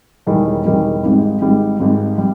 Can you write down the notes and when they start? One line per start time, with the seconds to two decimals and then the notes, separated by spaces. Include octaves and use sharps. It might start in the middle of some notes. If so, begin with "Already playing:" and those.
0.26 E1 E2 D#3 G3
0.65 E1 E2 D#3 G3
1.03 G#1 G#2 G3
1.42 G#1 G#2 G3
1.80 G#1 G#2 G3
2.18 G3